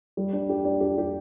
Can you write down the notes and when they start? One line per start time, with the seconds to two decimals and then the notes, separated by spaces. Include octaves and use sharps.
0.17 G3
0.33 D4
0.49 G4
0.64 D4
0.80 G4
0.98 G4